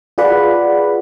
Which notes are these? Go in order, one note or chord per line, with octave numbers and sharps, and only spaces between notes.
F4 G#4 B4 D5 F#5 B5